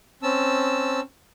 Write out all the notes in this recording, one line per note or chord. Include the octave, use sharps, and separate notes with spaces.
C4 C#4 A5 E6